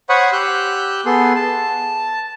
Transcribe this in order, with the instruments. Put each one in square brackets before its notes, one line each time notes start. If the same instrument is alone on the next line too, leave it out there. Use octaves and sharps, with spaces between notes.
[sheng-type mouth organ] C5 C#5 F#5 B5 C#6 D#6
G4 E6 F#6 G6
B3 G#4 A4 C6
A5